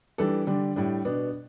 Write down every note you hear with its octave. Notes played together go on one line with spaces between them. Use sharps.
E3 G3 D4 A4
D3 G3 D4
A2 G3 D4
B2 B3 D4